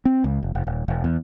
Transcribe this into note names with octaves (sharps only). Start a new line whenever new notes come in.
C4
C#2
F1
F1
D#1
E1
E2